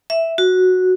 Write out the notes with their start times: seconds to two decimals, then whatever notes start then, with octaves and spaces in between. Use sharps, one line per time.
0.10 E5
0.38 F#4